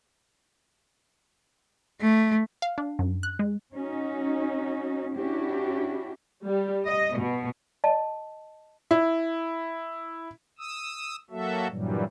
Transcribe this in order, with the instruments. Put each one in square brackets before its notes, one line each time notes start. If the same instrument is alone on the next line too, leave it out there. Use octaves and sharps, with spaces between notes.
[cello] A3
[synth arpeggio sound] F5
D4
F#2
F#6
G#3
[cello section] C#4 D#4 F#4
C#4 D4 E4 F#4 G4
[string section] G3
D#5
B2
[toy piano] D#5 A5
[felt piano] E4
[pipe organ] D#6 E6
F#3 A#3 F#4 A4 E5
G2 A#2 E3 F#3 G3